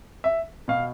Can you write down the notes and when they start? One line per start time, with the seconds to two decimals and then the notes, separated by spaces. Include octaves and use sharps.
0.24 E5
0.68 B2 F5